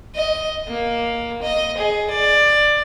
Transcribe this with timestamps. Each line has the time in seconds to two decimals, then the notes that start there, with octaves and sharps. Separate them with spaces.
0.15 D#5
0.68 A#3
1.42 D#5
1.77 G#4
2.10 D5